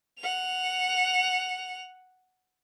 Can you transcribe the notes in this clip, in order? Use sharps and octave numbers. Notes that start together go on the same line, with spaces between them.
F#5 F7